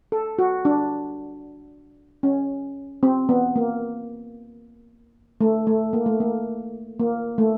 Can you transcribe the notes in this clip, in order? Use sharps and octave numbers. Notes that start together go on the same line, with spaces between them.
A4
F#4
D4
C#4
C4
B3
A#3
A3
A3
A#3
A3
A#3
A#3
A3